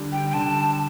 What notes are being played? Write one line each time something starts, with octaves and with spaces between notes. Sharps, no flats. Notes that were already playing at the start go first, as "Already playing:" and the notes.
Already playing: D3 G3
G5
G5
D3 A5